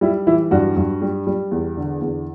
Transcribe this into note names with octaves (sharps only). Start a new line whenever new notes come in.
G3 E4
E3 E4
G2 D4 F#4
G2
G3
G3
E2
D3
E2